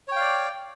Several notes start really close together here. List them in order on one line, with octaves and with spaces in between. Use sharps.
C#5 G5 F5 D5